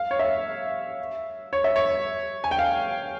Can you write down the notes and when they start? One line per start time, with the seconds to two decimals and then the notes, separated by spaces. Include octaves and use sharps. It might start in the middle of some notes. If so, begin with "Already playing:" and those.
Already playing: F5
0.11 C#5
0.19 E5
1.53 C#5
1.64 E5
1.76 C#5
2.44 G#5
2.51 G5
2.59 F5